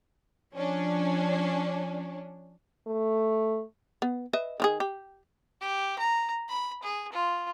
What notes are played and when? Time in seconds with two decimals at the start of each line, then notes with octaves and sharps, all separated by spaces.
0.55 F3 C#4 D4
2.87 A3
4.02 B3
4.33 B4 D#5 E5
4.60 D#3 F4 G#4
4.80 G4
5.61 G4
5.98 A#5
6.49 B5
6.83 G#4
7.12 F4